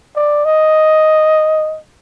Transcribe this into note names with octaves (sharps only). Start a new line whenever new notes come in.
D5
D#5